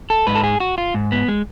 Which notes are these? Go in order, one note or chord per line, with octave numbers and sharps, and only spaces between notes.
A4
G#2 B4
A4
G#4
F#4
F4
G#2
B3
G#3